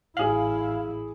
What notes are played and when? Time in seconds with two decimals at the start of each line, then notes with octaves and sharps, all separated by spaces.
0.17 A1 E4 G#4 F5 F#7